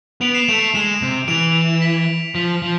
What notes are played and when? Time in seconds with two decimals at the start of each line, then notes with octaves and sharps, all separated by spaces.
0.21 B3 D7 F7
0.35 C7 E7
0.48 A3 D7 F7
0.75 G#3 C7 E7
1.02 C3
1.28 E3 D7 F7
1.82 B6
2.35 F3 B6
2.62 F3